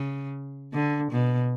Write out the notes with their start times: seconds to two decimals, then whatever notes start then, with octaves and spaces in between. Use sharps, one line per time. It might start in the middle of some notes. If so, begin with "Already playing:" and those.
Already playing: C#3
0.73 D3
1.11 B2